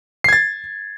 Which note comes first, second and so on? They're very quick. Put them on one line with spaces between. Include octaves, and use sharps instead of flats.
C7 G#6 A6